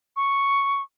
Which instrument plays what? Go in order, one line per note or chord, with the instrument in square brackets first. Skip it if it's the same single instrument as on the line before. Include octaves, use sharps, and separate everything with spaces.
[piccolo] C#6